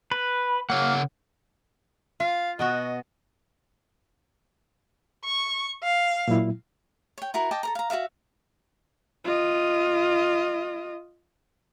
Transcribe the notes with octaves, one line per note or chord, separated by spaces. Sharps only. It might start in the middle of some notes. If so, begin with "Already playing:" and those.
B4
C#3 A#3 C#5 F#5
F4 F5
B2 B3 F#4 D#5
C#6
F5
A#2 F#3 E4
C#5 G5
E4 F#4 A#4
D#5 G5 A5 D6
A4 A#4 A#5
F5 A#5
F#4 A#4 E5 F5
F4 D#5